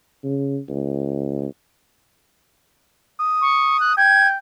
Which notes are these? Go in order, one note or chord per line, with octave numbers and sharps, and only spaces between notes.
C#3
C#2
D#6
C#6
F#6
G5 G#6